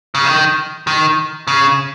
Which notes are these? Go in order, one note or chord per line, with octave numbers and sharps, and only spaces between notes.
C#3
D#3
D#3
C#3